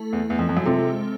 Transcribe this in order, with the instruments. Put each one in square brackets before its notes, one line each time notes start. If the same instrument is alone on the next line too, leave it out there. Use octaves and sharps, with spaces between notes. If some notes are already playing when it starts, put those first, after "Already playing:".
Already playing: [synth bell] A3 E4 A4
[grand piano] E2
E2
F2
F2
F#2
[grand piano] C3 [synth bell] G#3 C4 F4 A4